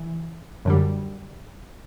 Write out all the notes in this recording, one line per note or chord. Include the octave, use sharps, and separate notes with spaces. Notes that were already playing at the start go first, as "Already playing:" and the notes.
Already playing: E3
F#2 D3 G3